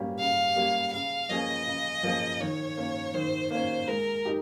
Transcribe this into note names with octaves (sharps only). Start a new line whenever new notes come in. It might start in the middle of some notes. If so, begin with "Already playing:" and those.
Already playing: G3 A#3 C#4 G4
C#3 F5
G3 A#3 C#4 G4
C#3 F5
F3 A#3 C#4 G#4 D#5
C#3
F3 A#3 C#4 G#4
D#3 C#5
A#3 C#4
D#3 C5
A#3 C#4 C5
G#3 A#4
D#4 G4